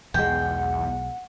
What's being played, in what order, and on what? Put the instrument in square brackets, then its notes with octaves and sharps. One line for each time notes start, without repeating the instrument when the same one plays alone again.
[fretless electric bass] B1 G#3 [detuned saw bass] E2 [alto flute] F#5 [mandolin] G5